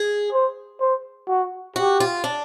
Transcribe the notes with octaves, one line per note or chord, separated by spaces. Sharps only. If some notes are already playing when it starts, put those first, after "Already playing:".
Already playing: G#4
C5
C5
F#4
F#4 G4
F4
D4